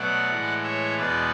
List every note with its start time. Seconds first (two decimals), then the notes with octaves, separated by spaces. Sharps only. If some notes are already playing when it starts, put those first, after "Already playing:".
Already playing: B2 F#3 A3 D5 F#5
0.30 A2 E3 G#3
0.63 C#5 E5
0.97 E2 B2 G#3 B4 D5